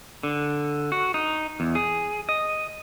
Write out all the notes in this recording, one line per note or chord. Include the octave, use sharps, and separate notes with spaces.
D3
F#4
D#4
E2
G#4
D#5